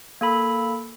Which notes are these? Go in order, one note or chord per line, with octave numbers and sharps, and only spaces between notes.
A#3 A4 B5